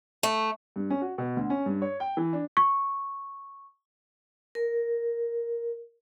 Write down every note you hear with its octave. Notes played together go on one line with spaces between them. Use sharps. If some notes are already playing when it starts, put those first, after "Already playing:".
A3
G2
C#4
F#4
B2
D2
C#4
G2
C#5
G5
E3
D4
C#6
A#4